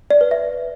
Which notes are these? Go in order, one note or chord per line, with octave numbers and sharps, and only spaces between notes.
D5
B4
E5